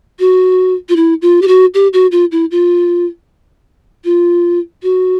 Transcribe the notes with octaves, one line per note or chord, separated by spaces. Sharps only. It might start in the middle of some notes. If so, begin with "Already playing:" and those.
F#4
F4
E4
F4
G4
F#4
G4
F#4
F4
E4
F4
F4
F#4